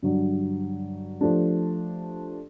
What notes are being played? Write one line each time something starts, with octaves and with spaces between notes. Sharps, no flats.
G2 D3 F#3
F3 A3 D4 G4